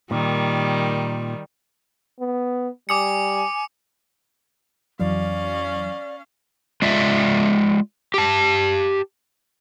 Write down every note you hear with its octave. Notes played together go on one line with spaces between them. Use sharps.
A#2 D#3 G3
B3
G3 G#5 D6 D#6 C#7
F2 E3 F#3 C#4 D5 F5
G#3 F4 D5 E5
G4 A5